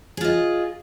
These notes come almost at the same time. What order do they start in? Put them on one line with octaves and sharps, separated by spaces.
G#4 F4 D#5